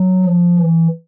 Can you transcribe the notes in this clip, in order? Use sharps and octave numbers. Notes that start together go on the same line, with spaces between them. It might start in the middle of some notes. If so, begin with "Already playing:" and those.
Already playing: F#3
F3
E3